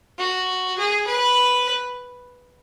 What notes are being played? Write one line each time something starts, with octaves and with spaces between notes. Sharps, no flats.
F#4
G#4
B4